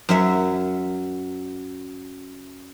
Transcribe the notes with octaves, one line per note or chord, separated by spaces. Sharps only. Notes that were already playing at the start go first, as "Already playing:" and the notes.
F#2 F#3 E5